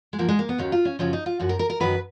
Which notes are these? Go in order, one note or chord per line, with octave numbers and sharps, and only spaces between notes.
G#3
G#2 F3 A#3
G#3
A#3
B3
D#2 D#3 F#3 C#4
F4
C#4
F#2 C#3 F3 C#4
D#4
F4
F#2 F3 F#4
A#4
A#4
A#4
F#2 D#3 F#3 B4